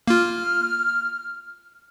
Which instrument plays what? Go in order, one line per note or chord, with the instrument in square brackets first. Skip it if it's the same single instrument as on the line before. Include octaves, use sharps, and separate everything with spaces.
[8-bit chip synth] A#3 F4 [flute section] F6